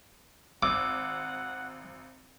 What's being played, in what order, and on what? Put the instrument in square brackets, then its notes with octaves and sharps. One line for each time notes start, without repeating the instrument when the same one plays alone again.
[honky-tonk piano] G#1 [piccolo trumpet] F#5 [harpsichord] D6 [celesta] E6